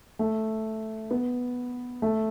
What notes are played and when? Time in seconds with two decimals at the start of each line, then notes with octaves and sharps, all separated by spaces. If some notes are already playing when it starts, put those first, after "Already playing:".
0.19 A3
1.11 B3
2.02 A3